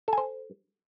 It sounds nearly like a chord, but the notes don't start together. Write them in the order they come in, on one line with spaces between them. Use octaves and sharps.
A4 G#5 C5